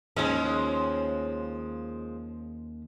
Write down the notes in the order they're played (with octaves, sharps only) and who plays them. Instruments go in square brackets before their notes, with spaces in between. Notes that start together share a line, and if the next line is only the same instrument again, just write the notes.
[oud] D#2 C#4 [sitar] F3 G#3